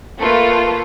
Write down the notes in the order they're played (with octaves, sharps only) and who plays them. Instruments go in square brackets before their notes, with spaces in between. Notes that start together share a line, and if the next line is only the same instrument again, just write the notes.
[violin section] A3 A#3 F4 A4 B4